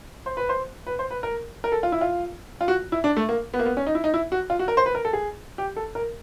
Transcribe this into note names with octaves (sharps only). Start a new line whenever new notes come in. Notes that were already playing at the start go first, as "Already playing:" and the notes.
C5
B4
C5
B4
C5
B4
A#4
A#4
A4
F4
E4
F4
F4
F#4
E4
D4
A3
A#3
B3
A#3
B3
C#4
D#4
E4
D#4
E4
F#4
F4
F#4
A#4
C5
B4
A#4
A4
G#4
G4
A4
A#4